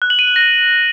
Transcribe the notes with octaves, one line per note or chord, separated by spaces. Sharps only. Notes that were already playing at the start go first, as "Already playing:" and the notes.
F#6
F#7
D#7
F#7
A#6